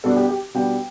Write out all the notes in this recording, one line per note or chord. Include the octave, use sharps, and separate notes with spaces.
B2 G3 B3 D4 A4
G4
G4
B2 G3 B3 D4 G5